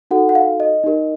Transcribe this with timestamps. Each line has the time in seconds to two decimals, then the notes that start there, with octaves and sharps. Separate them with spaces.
0.11 D#4 F#4 A4 F#5
0.29 F#5
0.35 F5
0.60 D#5
0.84 D#4 G4 A#4